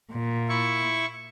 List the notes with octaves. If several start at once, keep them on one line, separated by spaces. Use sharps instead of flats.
A#2
E4 C#6